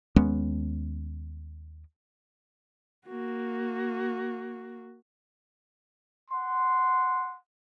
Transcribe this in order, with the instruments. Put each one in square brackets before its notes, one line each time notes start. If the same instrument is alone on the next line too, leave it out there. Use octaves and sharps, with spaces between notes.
[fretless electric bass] D#2 G#3 B3 C#4
[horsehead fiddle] A#3 F#4
[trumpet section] F#5 C6